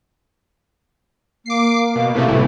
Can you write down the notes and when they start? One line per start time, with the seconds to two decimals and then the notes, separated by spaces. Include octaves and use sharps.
1.46 A#3 D6 C7
1.95 B2
2.15 A2 C3 A3
2.28 G1 E3